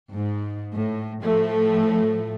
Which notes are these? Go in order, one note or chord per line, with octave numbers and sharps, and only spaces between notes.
G#2
A2
A2 F3 A3